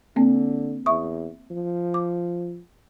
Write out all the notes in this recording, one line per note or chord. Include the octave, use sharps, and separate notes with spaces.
D3 A#3 C4
E2 E5 C#6 D#6
F3
D6